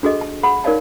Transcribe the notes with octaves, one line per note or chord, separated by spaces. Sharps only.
D4 F#4 G#4 A4 D#5
A5
G#4 F#5 B5
D#4 A#4 C#5 D5 F5 A5